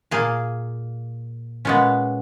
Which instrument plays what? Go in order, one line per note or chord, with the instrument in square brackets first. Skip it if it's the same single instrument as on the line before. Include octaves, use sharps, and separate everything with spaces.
[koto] A#2 A#3 G#4
A#2 G#3 B3 C#4